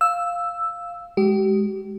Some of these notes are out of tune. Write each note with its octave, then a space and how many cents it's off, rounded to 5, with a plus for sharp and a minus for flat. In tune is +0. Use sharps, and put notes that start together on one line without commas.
F5 +0 E6 +0
G#3 +0 G4 -35